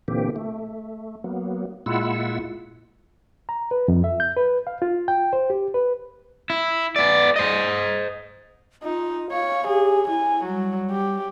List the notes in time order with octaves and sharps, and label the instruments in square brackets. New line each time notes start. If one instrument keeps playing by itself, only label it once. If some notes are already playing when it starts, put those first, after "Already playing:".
[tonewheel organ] A#2 D3 E3 A#3 C4 G4
A3
F#3 A#3 B3
A#2 G#3 E4 F4 F#5 E6
[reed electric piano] A#5
B4
F2
E5
G6
B4
F5
F4
G5
C5
G4
B4
[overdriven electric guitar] E4
B3 D5
C5 D#5
[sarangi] D#4 [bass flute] F4
[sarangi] C#5 [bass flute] F5
[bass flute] G4 [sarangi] G#4
[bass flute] E4 [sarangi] G#5
[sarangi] F#3 [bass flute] G3
[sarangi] G4